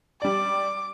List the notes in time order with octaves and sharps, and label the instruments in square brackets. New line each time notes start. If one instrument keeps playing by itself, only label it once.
[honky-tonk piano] G3 D5 [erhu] D6